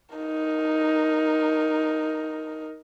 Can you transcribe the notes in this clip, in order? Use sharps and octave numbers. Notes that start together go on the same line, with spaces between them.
D#4 A#4